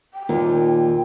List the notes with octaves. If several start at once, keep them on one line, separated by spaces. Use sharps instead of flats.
G5
D#2 A#2